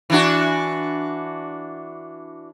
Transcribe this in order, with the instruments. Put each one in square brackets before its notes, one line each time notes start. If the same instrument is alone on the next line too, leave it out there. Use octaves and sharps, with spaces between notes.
[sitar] E3 D4 F#4